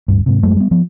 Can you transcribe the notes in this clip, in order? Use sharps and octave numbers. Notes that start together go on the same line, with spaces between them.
D1 G2
G#2 C3
F#2 F#3 G#3 A3
G3 B3
F3 B3